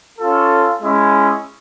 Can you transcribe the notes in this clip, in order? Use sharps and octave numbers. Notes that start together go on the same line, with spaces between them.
C#4 F4 A4
G#3 C#4 E4